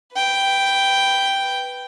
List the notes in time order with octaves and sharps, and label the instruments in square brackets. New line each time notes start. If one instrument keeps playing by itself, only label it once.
[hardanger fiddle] B4 G5